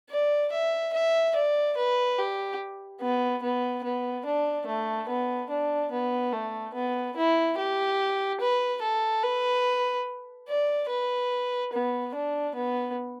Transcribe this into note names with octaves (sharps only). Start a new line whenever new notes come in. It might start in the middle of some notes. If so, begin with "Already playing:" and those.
D5
E5
E5
D5
B4
G4
B3
B3
B3
D4
A3
B3
D4
B3
A3
B3
E4
G4
B4
A4
B4
D5
B4
B3
D4
B3